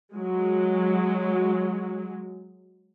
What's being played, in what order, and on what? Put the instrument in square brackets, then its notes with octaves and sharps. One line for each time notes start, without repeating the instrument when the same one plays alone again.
[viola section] F#3 G#3